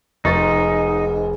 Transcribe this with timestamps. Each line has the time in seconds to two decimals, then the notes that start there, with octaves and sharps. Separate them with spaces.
0.25 F1 G#2 D#4 C#6 A6